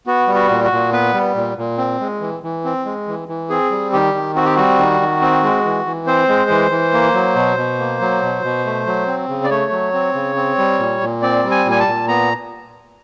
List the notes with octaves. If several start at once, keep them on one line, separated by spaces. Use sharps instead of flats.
B3 F#4
G3
F#4
A#2
F#4
A#2
B3 B4
G3
A#2
A#2
C4
G#3
E3
E3
C4
G#3
E3
E3
C4 G#4
G3
D#3 G4
D#3
C4 F#4
G4
G3 F#4
D#3
D#3
C4
G#3
E3
E3
C4 C5
G#3
E3
E3
A#3
F#3
B2
B2
A#3
F#3
B2
B2
A3
F#3
C4
C#3
D5
A3 C#5
F#3
C4
C#3
C4
G3
A#2
A#2
C4 D5
G3
G#5
A#2
G#5
A5
A#2
B3 A#5